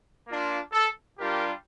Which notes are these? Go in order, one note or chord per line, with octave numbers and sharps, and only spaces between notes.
A#3 D4 F4
A4
G3 D4 F4 G4 A#4